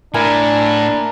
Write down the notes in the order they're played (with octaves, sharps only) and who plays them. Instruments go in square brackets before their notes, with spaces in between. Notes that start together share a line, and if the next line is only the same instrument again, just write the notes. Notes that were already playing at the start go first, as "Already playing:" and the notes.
[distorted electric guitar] A2 [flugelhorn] D4 [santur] E4 A#4 G#5